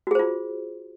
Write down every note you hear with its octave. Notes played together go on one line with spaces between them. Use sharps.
F4 F#4 G#4 C5